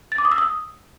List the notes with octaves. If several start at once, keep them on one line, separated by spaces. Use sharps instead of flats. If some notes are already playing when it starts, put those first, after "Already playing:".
A6
D6
D#6
E6
D#6